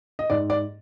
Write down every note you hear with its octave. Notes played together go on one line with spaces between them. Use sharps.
D#5
G#2 D5
D5